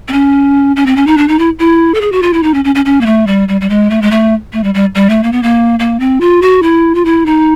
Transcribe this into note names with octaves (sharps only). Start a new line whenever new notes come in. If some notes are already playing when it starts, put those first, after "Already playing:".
C4
C#4
C#4
C4
C#4
D#4
D4
D#4
E4
E4
A4
G#4
F#4
F4
E4
D#4
C#4
C#4
C#4
C#4
A#3
A3
G3
G3
G3
G#3
A3
G#3
A3
A3
G3
G3
G3
A3
A#3
B3
A#3
A#3
C4
F4
F#4
E4
F4
E4
D#4